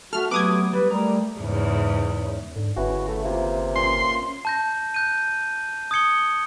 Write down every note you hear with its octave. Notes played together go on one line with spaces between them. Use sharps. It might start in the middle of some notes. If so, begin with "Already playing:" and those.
A3 F#4 A4 F6
F#3 A3 B3 G4 B4 D6 D#6 G#6
G3 B4
G3 A3 A#4
E2 G#2 C#3
G#2 D3
G1 C#3 E3 F#4
A3
C3 A#3 F4
A#2 C#4 B4 C6
A5 G6 A#6
F#6 G6 D#7
D#6 G#6 C#7 G7